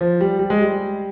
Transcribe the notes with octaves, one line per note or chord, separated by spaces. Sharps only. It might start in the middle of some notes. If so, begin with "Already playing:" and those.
F3
G3
G3
G#3
G3